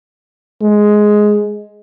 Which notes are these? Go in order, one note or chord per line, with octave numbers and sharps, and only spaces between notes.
G#3